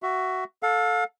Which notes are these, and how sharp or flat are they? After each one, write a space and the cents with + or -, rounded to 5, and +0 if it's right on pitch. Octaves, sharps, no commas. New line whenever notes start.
F#4 +10 E5 +15
A4 +0 F5 +35